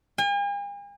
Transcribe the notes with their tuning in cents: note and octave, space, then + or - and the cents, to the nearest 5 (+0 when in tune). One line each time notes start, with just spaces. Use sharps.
G#5 -45